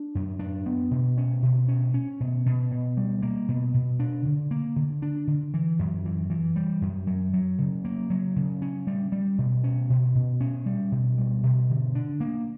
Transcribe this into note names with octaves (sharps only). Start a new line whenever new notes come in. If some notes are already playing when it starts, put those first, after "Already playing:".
Already playing: D4
F#2
D4
B3
B2
C#4
B2
C#4
C#4
B2
B2
B2
G3
A#3
B2
B2
D4
D3
A#3
D3
D4
D3
E3
F#2
E3
E3
G3
F#2
F#3
F#3
C#3
A#3
F#3
C#3
C#4
G3
G3
B2
C#4
B2
B2
C#4
G3
B2
G3
B2
D3
D4
A#3